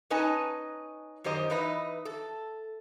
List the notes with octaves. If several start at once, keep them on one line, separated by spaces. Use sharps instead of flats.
C#4 D#4 B4 D#5 G#5 A5
F#2 D#3 G4 C5 D#5
E3 D#4 B4 D#5 E5
A4